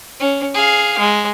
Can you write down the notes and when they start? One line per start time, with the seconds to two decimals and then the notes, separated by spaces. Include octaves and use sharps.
0.20 C#4
0.54 G#4 F5
0.99 G#3